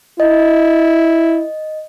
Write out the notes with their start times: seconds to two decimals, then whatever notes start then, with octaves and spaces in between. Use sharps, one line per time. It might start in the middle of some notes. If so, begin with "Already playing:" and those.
0.20 E4 D#5